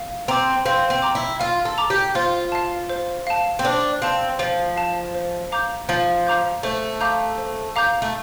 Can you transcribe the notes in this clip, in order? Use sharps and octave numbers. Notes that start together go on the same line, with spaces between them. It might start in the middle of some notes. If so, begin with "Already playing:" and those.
Already playing: F5
C4 A#5 D6
C4 F5
C4
A#5 D6
E4
F4 F5
A4
A#5 D6
G4
F4 C5
F5 A5
C5
F5 A5
C4
D4 C5
C4 F5 A5
F3 C5
F5 A5
C5
F5 A#5 D6 G6
F3 C5
F5 A#5 D6 G6
A3 C5
F5 A#5 D6 G6
C5
F5 A#5 D6 G6
A3